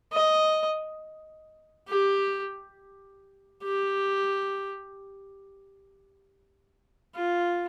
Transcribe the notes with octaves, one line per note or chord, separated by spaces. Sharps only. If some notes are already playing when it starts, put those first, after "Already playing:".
D#5
G4
G4
F4